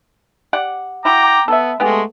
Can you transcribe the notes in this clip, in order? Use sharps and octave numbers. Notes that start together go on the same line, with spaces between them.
G4 D5 F#5
E4 F#4 G5 A#5 D6
B3 A4 E5
G#3 A3 B3 G4 G#4